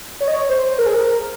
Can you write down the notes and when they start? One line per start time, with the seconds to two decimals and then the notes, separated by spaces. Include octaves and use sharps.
0.20 C#5
0.28 D#5
0.34 C#5
0.49 C5
0.78 A#4
0.86 G#4
0.94 A#4